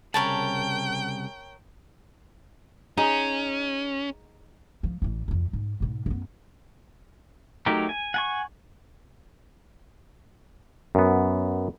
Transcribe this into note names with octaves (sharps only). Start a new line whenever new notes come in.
C2 C#3 A#4 C#5 G5 A5 B5
C#4 D#4 G#4
F3
A1 E3
F2 E3
G#2
G#2 B2
F#2 B3
F#3 A3 D#4 G4 A#4
G#5
F#5 G#5 C#6
F#2 B3